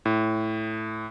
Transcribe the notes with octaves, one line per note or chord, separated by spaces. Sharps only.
A2